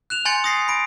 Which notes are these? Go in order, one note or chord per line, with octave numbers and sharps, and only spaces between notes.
F#6 E7 F7
G#5 C6 G6 A6 C#7
D#6 A#6 C7
B5 D7